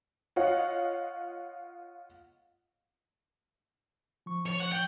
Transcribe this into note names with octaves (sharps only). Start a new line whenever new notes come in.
F4 C#5 D#5 F5 F#5
F3 C#6
C#5
F#5
G5